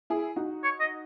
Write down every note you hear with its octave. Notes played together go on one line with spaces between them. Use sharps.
E4 G#4
D#4 F#4
C#5
D#5